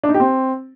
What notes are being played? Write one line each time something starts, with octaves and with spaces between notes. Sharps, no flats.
D4
D#4
G4
C4